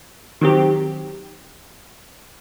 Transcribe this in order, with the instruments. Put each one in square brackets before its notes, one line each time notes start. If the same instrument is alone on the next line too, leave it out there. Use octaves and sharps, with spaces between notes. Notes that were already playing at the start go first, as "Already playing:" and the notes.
[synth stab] D#3 F#3 C4 G4